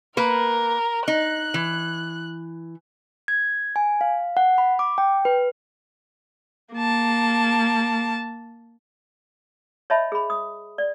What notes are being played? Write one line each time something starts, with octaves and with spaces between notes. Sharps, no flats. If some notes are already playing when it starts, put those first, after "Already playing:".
A#3 A#4 B4
D#4 F#6
E3
G#6
G#5
F5
F#5
B5
D6
G5
B4
A#3 A5
C#5 D#5 E5 A5 B5
G#4 B5
D#6
D5